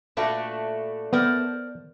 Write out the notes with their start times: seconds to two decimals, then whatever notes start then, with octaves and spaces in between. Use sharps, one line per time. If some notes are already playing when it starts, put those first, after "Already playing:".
0.17 A#2 A3 D4 F#4 B4
1.13 B3 A#4 C5 D5